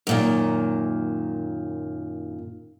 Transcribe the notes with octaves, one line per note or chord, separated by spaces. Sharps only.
F#2 A#2 D#3